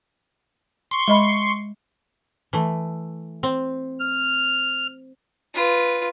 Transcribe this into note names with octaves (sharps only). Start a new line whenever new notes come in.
C6 C#6
G#3 D#5 B5
E3 A3
C4
F6
F4 B4